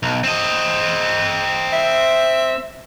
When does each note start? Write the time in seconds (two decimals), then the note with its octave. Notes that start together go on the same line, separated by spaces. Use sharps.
0.03 B1
0.24 C4 D#5
1.73 E5